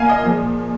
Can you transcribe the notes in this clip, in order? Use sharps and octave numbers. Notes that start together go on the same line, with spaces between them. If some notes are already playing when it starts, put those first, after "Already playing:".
Already playing: A#2 A#3 F5 G#5
D#5
A#2 F3 G#3